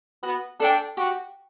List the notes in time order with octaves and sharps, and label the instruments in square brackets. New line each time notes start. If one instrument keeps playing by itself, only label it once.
[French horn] B3 [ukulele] F#4
[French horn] D4 [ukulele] A4 D5 G5
[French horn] F#4 [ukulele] G4